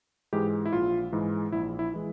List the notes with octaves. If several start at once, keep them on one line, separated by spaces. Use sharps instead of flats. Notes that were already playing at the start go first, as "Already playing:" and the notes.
G#2 E3 G#3 G4
E4
A#1 F4
G#2 E3 G#3
A#1 E4
E4
E3 G#3